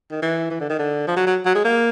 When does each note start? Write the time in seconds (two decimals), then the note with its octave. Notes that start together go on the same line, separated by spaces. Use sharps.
0.11 D#3
0.22 E3
0.51 E3
0.60 D3
0.70 D#3
0.79 D3
1.07 F3
1.16 F#3
1.27 F#3
1.46 F#3
1.55 G#3
1.65 A#3